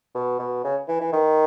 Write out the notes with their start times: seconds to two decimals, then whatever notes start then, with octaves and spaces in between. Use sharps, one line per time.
0.15 B2
0.39 B2
0.64 C#3
0.88 E3
1.01 E3
1.13 D#3